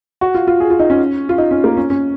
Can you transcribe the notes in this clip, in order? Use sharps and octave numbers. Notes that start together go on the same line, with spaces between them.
F#4
F4
F4
G#4
F4
D#4
C#4
F4
D#4
C#4
A#3
C#4
C#4